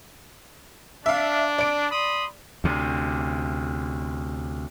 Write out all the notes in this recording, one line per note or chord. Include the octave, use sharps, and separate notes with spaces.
D4 E5 F5
D5 D7
B5 C6 D#6
D2 C3